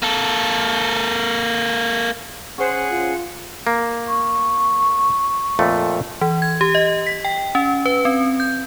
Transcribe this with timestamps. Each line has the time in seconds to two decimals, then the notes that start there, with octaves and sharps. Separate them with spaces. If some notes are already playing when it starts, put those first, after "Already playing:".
0.02 A#3 A4
2.58 C#4 G#4 C5 F#5
2.91 F4
3.67 A#3
4.08 C#6
5.59 F2 A#2 A3
6.21 E3
6.42 G#6
6.61 G4
6.75 D#5
7.07 B6
7.25 G5
7.55 C#4
7.86 B4
8.05 C4
8.40 G6